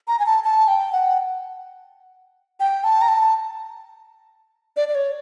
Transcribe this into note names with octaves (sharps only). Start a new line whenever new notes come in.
A#5
G#5
A5
A5
G5
F#5
G5
A5
A#5
A5
D5
D5
C#5